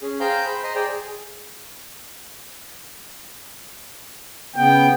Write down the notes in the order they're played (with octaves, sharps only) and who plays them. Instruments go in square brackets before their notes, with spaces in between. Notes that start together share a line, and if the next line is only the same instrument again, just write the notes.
[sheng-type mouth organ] C#4 G#4
G#4 C5 F5 G5 A#5 G6
C5 B5
C5 D#5 A#5 C6
G#4 C5 D5 G5 A#5
G#4
[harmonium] C#3 B3 [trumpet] G5